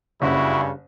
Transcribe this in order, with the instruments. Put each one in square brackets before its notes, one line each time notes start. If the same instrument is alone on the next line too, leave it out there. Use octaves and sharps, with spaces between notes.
[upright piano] F#1 B5 [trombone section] G2 C#3 [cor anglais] E4 [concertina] F#4